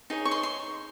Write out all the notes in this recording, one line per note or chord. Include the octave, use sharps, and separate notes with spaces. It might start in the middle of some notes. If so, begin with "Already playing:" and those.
D#4 G#4 C#5
C#6
C6
C6